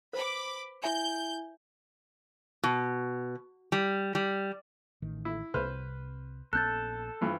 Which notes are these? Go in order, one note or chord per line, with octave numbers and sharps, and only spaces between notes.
B4 C5 B5 D6
E4 E5 G#5 G6
B2
G3
G3
A1 D#3
E4
C2 C3 B4 C5 F6
A#1 B3 C#4 A4 F#6 G6 A6
G2 E3 F3